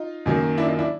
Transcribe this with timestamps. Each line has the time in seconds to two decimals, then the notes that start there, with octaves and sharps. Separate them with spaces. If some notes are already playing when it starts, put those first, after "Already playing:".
Already playing: D#4 F4
0.26 F#2 D#3 F#3 A#3
0.58 D4 E4
0.68 D#4 F4
0.79 D4 E4